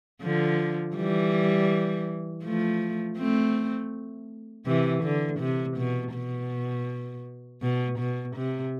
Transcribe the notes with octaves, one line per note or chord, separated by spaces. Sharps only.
D3 F3
E3 G3
F3 A3
A3 C4
C3 E3
D3
C3
B2
B2
B2
B2
C3